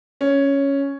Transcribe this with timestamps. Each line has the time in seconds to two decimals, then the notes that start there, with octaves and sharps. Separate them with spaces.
0.21 C#4